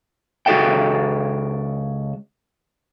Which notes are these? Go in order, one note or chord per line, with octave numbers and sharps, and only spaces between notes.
C#2 F#4 G#4 A4 E5 G5